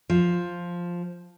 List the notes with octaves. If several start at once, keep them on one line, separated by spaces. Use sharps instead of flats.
F3